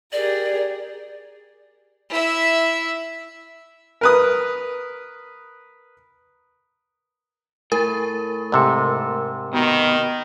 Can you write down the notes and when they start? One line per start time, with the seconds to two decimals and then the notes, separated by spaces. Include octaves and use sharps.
0.12 G4 G#4 A#4 D5
2.09 E4 E5
4.01 A#4 B4 D#6
7.72 A2 A#4
8.52 G#2 C3 A4
9.53 B2 D#3